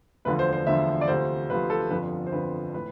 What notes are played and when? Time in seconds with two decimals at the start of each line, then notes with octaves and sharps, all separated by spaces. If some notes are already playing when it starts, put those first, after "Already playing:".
0.25 E1 D2 D3 F3 B4
0.39 C5
0.53 C5
0.67 E1 D2 D3 F3 E5
1.01 D5
1.08 D2 C3 F3 C5
1.50 D2 C3 F3 B4
1.70 A4
1.90 G1 F2 D3 F3 B4
2.27 C5
2.32 G1 F2 D3 F3 B4
2.74 A2 E3 B4